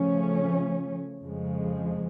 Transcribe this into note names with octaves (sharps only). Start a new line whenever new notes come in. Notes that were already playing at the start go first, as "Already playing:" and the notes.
Already playing: C#3 F3 A3 C#4
F2 C#3 F3 G#3